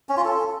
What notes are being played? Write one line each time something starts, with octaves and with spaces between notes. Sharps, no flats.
C#4
F4
A4